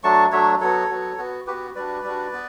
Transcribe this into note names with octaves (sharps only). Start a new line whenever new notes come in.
F#3 A3 D4 A5 C#6
F#3 A3 D4 C#5 E5
F#3 B3 F#4 A4 C#5
F#3 B3 F#4
B3 F#4
B3 F#4 G4 B4
G3 D4 F#4 B4 D5
G3 D4 F#4
B3